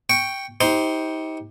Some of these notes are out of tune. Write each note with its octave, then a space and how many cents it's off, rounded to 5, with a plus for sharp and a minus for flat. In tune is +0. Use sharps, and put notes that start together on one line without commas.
G5 +0 C#6 +0
D#4 +35 G4 +0 C5 +0